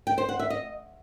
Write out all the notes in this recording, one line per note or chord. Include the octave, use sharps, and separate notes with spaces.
G5
C5
F#5
E5
D#5